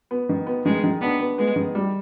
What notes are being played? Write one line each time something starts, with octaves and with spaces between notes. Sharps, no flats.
B3
D#3
B3
D#3 G#3
D#3
B3 D4
B3
G#3 B3
D#3
G3